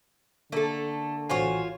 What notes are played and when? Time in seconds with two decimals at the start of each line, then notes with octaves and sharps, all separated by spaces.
0.52 D3 A3 A#3 A4
1.29 A1 F4 F#4 C5 C#5 G#5